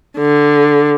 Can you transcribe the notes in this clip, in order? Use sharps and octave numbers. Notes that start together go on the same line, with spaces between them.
D3